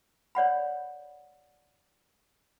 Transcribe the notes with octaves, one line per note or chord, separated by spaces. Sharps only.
C#5 D5 F#5 B5